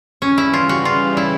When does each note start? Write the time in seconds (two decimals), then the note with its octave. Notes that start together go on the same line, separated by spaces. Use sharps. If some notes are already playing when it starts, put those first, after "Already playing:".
0.22 C#3 E3 G3 C#4
0.38 E4
0.53 F4
0.69 F#4
0.85 F4
1.17 E4